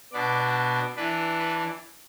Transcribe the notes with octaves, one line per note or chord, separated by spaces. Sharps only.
B2 B3 D4 D5
E3 D4 B4
B4